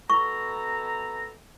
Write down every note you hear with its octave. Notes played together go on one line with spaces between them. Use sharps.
B2 A4 A#5 C#6